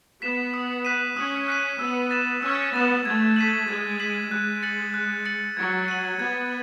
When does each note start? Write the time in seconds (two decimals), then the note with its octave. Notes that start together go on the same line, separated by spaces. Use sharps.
0.22 B3 B6 E7
0.54 D#6
0.85 F#6 B6 D#7
1.16 C#4 D#6
1.48 F#6 B6 D#7
1.79 B3 E6
2.11 A6 E7
2.42 C#4 E6
2.74 B3 A6 E7
3.05 A3 G#6
3.36 B6 D#7 F#7
3.68 G#3 G#6
4.00 B6 D#7 F#7
4.31 G#3 F#6
4.62 A6 C#7 F#7
4.94 F#6
5.26 A6 C#7 F#7
5.57 F#3 G#6
5.88 D#7 F#7
6.19 B3 G#6